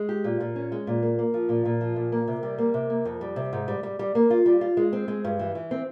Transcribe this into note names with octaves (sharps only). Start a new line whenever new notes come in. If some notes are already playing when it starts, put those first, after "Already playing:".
Already playing: G#3
G4
A#2
A#2
C#4
G#3
A#2
A#3
A#3
F3
A#2
A#2
F3
A#2
A#3
C3
G3
A#3
C3
A#3
F2
G3
C3
G#2
G3
G3
G3
A#3
F4
G3
F4
G#3
C4
G#3
G2
E3
E3
C4